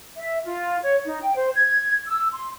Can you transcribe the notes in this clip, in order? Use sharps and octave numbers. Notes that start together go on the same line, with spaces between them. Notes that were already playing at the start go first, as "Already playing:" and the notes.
E5
F4
C#5
D#4
G5
C5
G#6
E6
C6